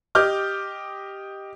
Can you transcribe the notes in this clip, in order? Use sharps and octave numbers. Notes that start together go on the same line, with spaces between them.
G4 D#5 D6 F6 G6